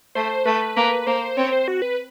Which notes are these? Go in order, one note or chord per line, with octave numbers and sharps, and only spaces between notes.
A3 C5
A3 B4
A#3 B4
A#3 C5
C4 C#5
C5
F#4
B4